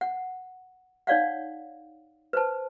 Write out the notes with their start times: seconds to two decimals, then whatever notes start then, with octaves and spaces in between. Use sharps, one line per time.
0.01 F#5
1.07 D#4 C#5 D5 F5 F#5
2.33 B4 C5 A5